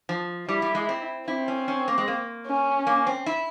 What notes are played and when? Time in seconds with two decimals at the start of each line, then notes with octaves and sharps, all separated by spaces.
0.09 F3
0.49 G3 E4
0.62 G3
0.75 G#3
0.89 C4
1.28 C4 E4
1.48 C#4
1.68 C#4
1.88 A#3
1.98 G#3
2.08 A#3
2.47 C#4
2.87 A#3
3.07 C4
3.26 E4